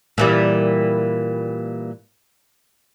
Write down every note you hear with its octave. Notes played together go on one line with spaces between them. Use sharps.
A#2 E3 G3